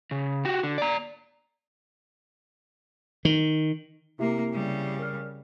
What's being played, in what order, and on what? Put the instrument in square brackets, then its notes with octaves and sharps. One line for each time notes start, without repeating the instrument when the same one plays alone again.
[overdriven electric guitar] C#3
F#4 G4
D3
D5 A#5
[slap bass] D#3
[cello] C3 A#3 [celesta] E4 G4 E5
[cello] C#3 G3
[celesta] A#4 F6